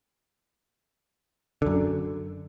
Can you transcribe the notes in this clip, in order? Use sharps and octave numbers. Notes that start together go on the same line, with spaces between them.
F#2 D3